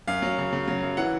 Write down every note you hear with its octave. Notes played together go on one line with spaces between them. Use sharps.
F#2 F5
F#3
C#3
C#3
F#3
F#2
E3 F#5